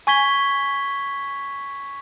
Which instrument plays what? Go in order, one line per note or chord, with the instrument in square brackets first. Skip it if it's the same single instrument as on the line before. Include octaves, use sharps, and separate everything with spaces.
[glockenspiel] G#5 C#6 G#6 B6 G7